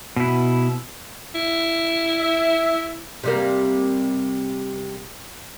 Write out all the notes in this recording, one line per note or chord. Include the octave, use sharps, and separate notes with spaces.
B2 E4
E4
E5
C3 G3 A#3